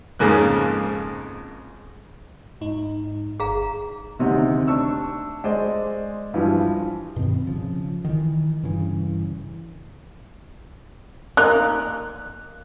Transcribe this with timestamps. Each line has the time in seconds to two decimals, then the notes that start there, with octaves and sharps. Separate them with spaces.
0.19 F2 G#2 C#3 A#3 F#6
2.61 G#2 D#4
3.40 G1 G#4 F5 A#5
4.19 D2 C3 D#3
4.67 D4 C#6 E6
5.44 G#3 C5 D5 D#5
6.34 G2 E3 F3
7.16 G2 B2 D#3 C4
7.47 C#3 F3
8.04 D#3 E3
8.63 G2 C#3 E3
11.37 A#3 D#4 F#6